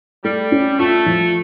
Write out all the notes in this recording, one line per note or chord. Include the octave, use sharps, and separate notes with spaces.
G3 A3
C#4
A3 F4
F3